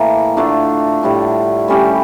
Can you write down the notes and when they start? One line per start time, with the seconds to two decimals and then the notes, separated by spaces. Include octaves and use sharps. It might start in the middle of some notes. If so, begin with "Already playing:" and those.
Already playing: A2 E3 A#3
0.37 D3 A3 D4 F4
1.03 A2 G3 D4
1.68 A2 G3 C#4 G4